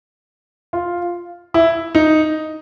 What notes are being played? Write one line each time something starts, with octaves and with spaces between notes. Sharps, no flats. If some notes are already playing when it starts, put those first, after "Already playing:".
F4
E4
D#4